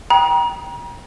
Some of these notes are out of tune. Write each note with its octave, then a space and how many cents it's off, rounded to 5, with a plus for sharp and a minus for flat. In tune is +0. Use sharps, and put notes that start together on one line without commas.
G5 +0 A#5 +35